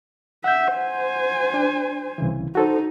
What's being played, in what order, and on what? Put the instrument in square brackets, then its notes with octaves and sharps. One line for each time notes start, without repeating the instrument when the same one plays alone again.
[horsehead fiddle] E5 [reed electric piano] F#5 G6
[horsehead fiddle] C5 G#5
[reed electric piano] D4
C2 C#3 E3
[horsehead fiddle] D#4 [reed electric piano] F#4 A4 C5